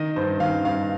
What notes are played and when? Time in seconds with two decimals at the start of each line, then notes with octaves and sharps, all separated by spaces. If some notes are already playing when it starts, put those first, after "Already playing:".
Already playing: D#3 D#5
0.16 G2 C5
0.40 D#3 F5
0.64 G2 F5